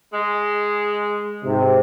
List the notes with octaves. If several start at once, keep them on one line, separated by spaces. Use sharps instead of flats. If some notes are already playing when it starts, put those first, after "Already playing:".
G#3
G#2 C3